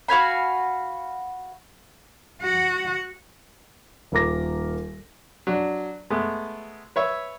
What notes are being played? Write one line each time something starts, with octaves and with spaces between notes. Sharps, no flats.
F#4 F5 G#5 B5
F#4 F#5
D#1 A#3 A#4 D6 A#6
F#3 D4
G#3 A3 B3
B4 C#5 E5